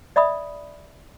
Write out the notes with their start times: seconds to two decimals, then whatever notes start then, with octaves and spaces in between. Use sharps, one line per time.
0.16 D5 E5 B5 D#6